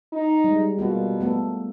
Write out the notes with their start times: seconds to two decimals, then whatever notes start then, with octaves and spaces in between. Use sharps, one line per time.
0.13 D#4
0.44 G3 G#3
0.79 B2 G3 A#3 F4
1.20 A3 B3 A4